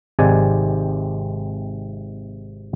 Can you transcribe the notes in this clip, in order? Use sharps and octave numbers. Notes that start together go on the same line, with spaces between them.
G#1 C3 D#3 G#3 D5 G#5